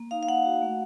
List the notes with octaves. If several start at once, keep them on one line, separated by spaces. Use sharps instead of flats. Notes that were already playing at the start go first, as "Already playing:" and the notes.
Already playing: A#3
D#4 F5
F5
A#3 F#5
F#4
A3